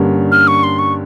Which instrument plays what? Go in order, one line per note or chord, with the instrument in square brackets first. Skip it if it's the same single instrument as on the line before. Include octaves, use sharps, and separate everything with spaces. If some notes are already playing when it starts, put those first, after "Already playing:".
Already playing: [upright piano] G2 D3 G3 A#3 C#4
[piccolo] F6
C#6
C6
C#6